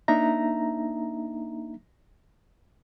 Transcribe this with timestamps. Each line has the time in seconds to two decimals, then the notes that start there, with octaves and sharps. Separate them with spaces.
0.08 A#3 D4 D#4 E5 A#5